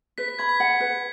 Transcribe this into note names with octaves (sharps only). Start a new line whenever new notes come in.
B4 B6
B6
B5 G#6
B6
F#5
B4